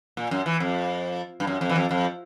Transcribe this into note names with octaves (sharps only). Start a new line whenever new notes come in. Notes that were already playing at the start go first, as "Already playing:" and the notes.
A#2
F#2
E3
F2
G2
F#2
F2
E3
F2
F2